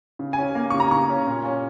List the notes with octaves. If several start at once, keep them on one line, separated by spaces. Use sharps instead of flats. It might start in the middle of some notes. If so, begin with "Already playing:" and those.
C#3
G#5
C#4
A#3
C#3 C#6
A#5
C#3 C#6
C#4
A#2
C#4